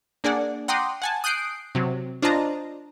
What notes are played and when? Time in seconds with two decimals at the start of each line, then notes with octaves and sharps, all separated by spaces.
0.24 A#3 D4 G#4 D5 F#5
0.68 F#5 G5 A#5 C6 D6 D#6
1.02 F#5 G#5 A5
1.24 D#6 F#6 G6 C7 D7
1.75 C3 F#3
2.22 D4 F4 C5 D#5 A5 A#5